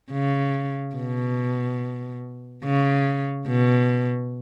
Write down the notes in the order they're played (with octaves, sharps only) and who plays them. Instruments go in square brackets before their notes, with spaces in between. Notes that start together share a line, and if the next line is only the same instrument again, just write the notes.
[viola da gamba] C#3
B2
C#3
B2